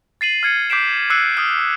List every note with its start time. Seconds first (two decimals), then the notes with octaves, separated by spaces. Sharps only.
0.21 A6 C7 D#7 F#7
0.43 F6 G#6 C#7
0.70 D6 G6 B6 C7 D7 E7
1.10 D6 E6 F#6 C7 C#7 D#7
1.37 D#6 F6